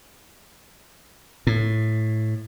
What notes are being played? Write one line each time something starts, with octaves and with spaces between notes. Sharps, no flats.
A2